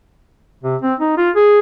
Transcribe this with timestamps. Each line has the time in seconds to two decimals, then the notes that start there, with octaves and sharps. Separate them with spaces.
0.63 C3
0.82 C4
1.00 D#4
1.18 F4
1.36 G#4